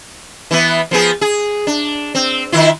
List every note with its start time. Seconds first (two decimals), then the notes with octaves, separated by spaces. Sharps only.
0.51 E3 B3
0.91 F3 B3 G#4
1.21 G#4
1.67 D4
2.15 C4
2.52 D#3 E4 F4